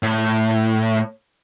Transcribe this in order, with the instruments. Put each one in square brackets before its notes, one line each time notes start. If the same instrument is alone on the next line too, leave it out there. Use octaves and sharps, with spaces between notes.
[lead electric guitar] A2